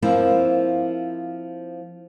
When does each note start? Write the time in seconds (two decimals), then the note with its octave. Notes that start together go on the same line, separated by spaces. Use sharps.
0.02 F3 A#3 C4 E4